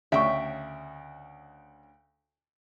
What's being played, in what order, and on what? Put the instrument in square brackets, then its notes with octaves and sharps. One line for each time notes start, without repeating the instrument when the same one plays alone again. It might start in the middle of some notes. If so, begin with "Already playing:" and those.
[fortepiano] D2 C#3 [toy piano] C#5 C#6 [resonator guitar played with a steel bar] E5 G5